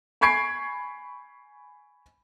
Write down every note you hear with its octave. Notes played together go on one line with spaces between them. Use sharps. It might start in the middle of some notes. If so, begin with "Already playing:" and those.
G#5 B5 C#6 G#6 C7 D7